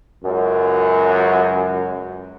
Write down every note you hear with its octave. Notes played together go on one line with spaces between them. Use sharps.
C#2 F#2